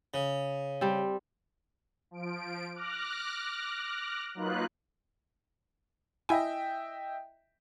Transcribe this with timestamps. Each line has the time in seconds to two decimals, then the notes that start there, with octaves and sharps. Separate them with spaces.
0.14 C#3
0.81 G3 C4
2.11 F3 D7
2.73 D6 F6 F#6 A#6
4.35 F#3 A#3 D#4 F4 B4 F#6
6.29 E4 D#5 E5 G5 G#5